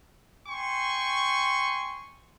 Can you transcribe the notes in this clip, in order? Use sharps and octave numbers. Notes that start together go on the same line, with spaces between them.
G5 G#5 C6 C#6